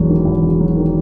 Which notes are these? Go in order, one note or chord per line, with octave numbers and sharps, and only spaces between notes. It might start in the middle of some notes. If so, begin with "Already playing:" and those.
Already playing: E1 E2 F#3
D#3
E2
E1
F#3
D#3